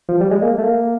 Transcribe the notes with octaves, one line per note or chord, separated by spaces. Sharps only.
F3
G3
G#3
A#3
A3
A#3